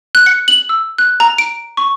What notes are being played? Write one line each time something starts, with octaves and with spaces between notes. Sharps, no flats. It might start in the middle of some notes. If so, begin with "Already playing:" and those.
F#6
C#7
F#7
E6
F#6
A#5
D7
C#6